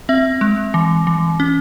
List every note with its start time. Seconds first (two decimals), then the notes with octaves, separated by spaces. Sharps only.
0.09 C4 E5
0.41 G#3
0.74 E3
1.07 E3
1.40 C#4